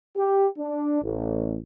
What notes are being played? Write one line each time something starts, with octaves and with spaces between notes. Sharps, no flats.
G4
D4
A1